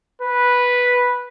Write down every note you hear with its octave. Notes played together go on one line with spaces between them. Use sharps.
B4